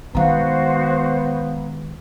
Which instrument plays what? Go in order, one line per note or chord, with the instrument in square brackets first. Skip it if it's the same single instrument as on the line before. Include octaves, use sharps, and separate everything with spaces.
[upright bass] D#3 G#3 [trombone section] B3 [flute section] F#4 C5 [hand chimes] F5 A#5